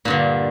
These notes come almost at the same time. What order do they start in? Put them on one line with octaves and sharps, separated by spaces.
A#2 G2 D3